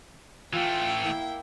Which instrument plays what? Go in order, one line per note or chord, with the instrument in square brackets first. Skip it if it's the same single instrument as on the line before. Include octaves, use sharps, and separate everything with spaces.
[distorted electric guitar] E3 A3 [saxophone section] F4 [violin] G5
[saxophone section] A#3 E4